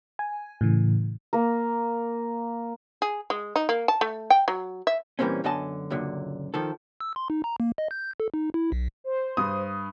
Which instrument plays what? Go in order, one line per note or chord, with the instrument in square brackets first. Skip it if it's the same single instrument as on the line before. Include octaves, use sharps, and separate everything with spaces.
[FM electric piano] G#5
A2 C#3 E3
[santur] A#3 A#4
[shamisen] G#4
G#3
D#4
A#3
A5
A3
G5
F#3
E5
[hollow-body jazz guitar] A#2 E3 G3 A#3 C4 C#4
F#2 D3 B3 D#5 G#5 A5
C#2 F#2 A#2 D3
D#3 F3 A4
[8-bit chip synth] E6
C6
D#4
A#5
A#3
D#5
G6
A4
D#4
E4
B1
[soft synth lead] C5
[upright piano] G2 D#6